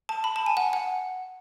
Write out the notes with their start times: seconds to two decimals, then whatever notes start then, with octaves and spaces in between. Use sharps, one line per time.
0.09 A5
0.24 B5
0.36 A5
0.46 G#5
0.57 F#5
0.73 F#5